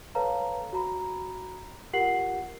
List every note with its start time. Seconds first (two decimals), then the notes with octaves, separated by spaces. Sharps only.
0.15 A4 B4 C#5 F5 A5 A#5
0.73 F#4 A#5 B5
1.93 F4 G4 A#4 F#5 C7 F#7